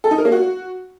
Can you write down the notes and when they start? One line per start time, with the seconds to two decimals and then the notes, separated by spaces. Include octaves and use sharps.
0.04 A4
0.11 D#4
0.18 A#4
0.25 A#3
0.32 F#4